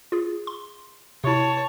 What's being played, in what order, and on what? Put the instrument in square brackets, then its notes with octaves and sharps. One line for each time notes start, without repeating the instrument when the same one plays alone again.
[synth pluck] F4 G#4
C6
[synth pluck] C3 E4 [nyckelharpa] C#5 A5